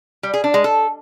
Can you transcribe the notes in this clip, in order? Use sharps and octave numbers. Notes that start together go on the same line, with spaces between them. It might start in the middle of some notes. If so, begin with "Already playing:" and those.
G3
G#4
D4
G#3
A4